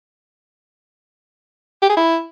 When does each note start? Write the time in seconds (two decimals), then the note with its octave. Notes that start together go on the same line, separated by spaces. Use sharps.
1.82 G4
1.89 G#4
1.97 E4